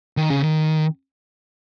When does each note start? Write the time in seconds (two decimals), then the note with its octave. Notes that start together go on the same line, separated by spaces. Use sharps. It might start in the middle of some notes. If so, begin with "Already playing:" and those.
0.17 D#3
0.30 C#3
0.43 D#3